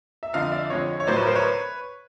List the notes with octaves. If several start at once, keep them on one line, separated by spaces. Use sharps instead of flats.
E5
F2 D3 F3 D#5 F5
D5 E5
F2 D3 F3 G#3 C#5 D#5
C#5
A2 F#3 C5 D5
B4 C#5
A#4 C5
B4 C#5